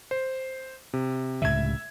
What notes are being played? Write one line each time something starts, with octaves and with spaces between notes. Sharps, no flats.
C5
C3
C#2 A2 C3 E5 G#6